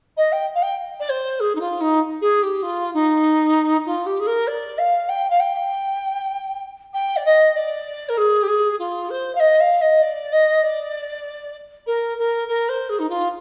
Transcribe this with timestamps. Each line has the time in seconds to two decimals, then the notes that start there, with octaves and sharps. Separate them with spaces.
0.17 D#5
0.32 G5
0.55 F5
0.62 G5
0.99 D5
1.09 C5
1.40 G#4
1.55 D#4
1.60 F4
1.80 D#4
2.21 G#4
2.42 G4
2.62 F4
2.94 D#4
3.86 F4
4.06 G4
4.19 G#4
4.26 A#4
4.47 D5
4.78 F5
5.09 G5
5.30 F5
5.39 G5
6.93 G5
7.16 D5
7.25 D#5
7.55 D5
8.09 A#4
8.17 G#4
8.42 G4
8.47 G#4
8.79 F4
9.09 C5
9.35 F5
9.39 D#5
9.60 F5
9.81 D#5
10.02 D5
10.32 D#5
10.63 D5
11.86 A#4
12.17 A#4
12.48 A#4
12.68 C5
12.89 G#4
12.99 D#4
13.09 F4